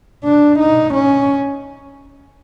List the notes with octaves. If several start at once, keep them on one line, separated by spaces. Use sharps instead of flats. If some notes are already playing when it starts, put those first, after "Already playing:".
D4
D#4
C#4